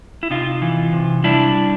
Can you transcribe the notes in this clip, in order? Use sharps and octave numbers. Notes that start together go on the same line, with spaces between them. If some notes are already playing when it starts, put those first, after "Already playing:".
E4
C3 D#4 F4
E3
C3
G3 D4 E4